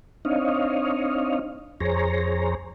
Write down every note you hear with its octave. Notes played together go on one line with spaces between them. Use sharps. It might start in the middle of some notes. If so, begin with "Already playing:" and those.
C4 D4 D#4 C#5 D#5 F5
F2 G#4 C5 C#5 A#5